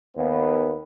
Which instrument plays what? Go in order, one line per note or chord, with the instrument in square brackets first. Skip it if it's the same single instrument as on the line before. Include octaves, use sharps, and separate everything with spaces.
[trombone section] D#2 B3